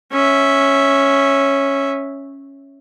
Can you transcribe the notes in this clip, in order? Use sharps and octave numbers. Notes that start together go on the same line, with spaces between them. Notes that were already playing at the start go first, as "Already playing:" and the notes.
C#4 E5